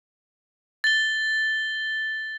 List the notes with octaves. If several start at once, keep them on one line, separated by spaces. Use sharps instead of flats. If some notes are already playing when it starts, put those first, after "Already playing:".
A6 G7